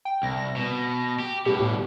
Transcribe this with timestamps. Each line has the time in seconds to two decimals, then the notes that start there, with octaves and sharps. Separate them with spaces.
0.05 G5
0.23 C2 A#6
0.56 B2
1.20 G4
1.46 G2 B2 G4
1.60 A2